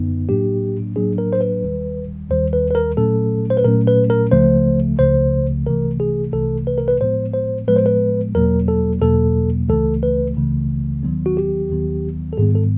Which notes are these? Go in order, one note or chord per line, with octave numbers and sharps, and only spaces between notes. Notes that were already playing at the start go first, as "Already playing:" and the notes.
Already playing: F#2 D3 B3 D#4
A2 F#3 A#3 D4 G4
A2 F#3 A#3 D4 G#4
A#4
C5
B4
D#2 D#3 G3
D#2 D#3 G3 C5
B4
B4
A#4
A#2 F#3 A3 C#4 A4
C5
B4
A#2 F#3 A3 C#4 A#4
B4
A#4
C#2 C#3 F3 A3 C5
C#2 C#3 F3 A3 C5
C2 C3 E3 A3 A#4
G#4
C2 C3 E3 A3 A4
B4
A#4
B4
A2 F3 G#3 B3 C5
C5
A2 F3 G#3 B3 B4
C5
B4
E2 B2 F#3 A#3 A#4
A4
E2 B2 F#3 A#3 A4
C#2 C#3 E3 A3 A4
B4
C#2 C#3 E3 A3
D#2 D#3 F#3 B3
F#4
G4
D#2 D#3 F#3 B3
A4
G#2 D#3 G3 B3 G#4
A4